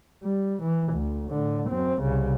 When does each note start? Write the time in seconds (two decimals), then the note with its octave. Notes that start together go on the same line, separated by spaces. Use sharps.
0.24 G3
0.63 E3
0.93 D2
1.31 A2 D3
1.70 F#2 C4
2.02 C2 C#3